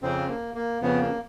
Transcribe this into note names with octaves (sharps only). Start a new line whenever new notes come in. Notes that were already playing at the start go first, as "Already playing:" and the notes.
F2 C#3 F3 C4
A#3
A#3
F2 C#3 F3 B3
A#3